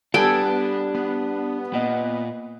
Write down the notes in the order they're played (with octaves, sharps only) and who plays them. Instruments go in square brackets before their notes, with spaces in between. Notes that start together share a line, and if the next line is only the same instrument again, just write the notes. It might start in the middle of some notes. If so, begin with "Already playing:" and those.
[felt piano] G3 D7 [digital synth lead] B3 [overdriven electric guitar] D4 [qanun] A4 G5 G#5
[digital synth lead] B3
[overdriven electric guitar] A#2 [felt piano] D#5 F#5